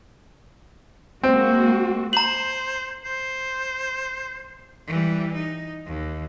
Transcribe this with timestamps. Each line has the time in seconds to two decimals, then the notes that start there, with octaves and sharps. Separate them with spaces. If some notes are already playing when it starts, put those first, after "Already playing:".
1.24 G#3 A#3 C4 F#4
2.13 C5 A#5 F#7
3.05 C5
4.88 E3 G3
5.34 D#4
5.86 D#2